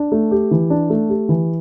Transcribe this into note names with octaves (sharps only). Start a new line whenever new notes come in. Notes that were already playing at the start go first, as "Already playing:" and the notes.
Already playing: D4
A3
G4
E3
D4
A3
G4
E3